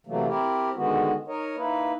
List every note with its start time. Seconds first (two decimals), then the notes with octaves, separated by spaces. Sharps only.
0.07 C3 E3 F#3 A3 A#3
0.27 C4 E4 G4 A#4
0.75 D3 D#3 G#3 B3 F#4
1.28 D#4 A#4 C#5 D#5
1.56 A#3 D#4 E4 B4